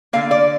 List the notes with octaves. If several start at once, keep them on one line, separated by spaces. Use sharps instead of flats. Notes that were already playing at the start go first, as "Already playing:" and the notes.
D3 A#3 F5
D5